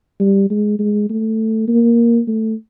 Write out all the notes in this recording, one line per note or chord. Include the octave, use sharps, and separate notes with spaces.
G3
G#3
G#3
A3
A#3
A3